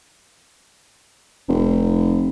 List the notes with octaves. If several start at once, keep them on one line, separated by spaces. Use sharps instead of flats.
F1